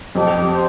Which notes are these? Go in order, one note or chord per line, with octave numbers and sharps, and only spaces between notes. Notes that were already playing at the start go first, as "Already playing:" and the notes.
F2 G4
C5